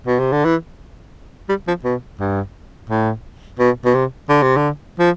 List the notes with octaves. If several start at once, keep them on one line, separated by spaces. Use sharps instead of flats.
B2
C3
D3
E3
G3
F3
B2
G2
A2
B2
B2
C3
D3
C3
D3
F3